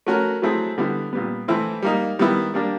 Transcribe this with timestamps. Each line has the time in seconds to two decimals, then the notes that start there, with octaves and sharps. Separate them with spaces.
0.06 A3 C#4 F#4 A#4
0.42 F#3 A3 C4 E4 G#4
0.78 D3 G3 B3 E4
1.13 A#2 G3 B3
1.48 E3 A3 C4 E4
1.82 G3 A#3 D#4
2.19 D#3 G3 B3 E4
2.54 G3 A#3 D4 G4